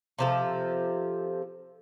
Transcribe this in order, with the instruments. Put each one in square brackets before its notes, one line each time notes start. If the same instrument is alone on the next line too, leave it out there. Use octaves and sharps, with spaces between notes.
[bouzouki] C3 F3 A4